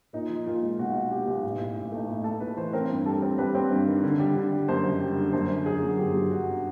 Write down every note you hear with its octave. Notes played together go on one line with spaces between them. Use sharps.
A#2 D#4
F3
A#2 F4
G#3
B1 F#4
G#3
B1 G4
B1
A1
A2
A1
A3 D#4
A2 E4
A2 A4
A3 B4
E3 C5
C4 A#4
G2
G3 A4
C4
G3 B4
C4
G2
D#3
D3
G3
D3
G3
F#2 C5
F#1
G3
D3
F#2 C5
D3
F#2 G#4
F#3
G1 G4
F#3
D3 F#4